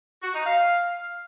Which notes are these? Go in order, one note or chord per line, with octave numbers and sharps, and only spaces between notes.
F#4
D#4
F5